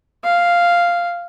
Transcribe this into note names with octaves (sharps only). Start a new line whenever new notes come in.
F5